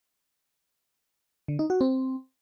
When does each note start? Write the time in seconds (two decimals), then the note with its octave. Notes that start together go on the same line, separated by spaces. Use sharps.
1.48 D3
1.59 D#4
1.70 F#4
1.81 C4